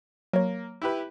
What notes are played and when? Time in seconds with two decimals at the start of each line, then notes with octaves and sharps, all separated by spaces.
0.33 F#3 A#3 C#5
0.82 E4 G4 B4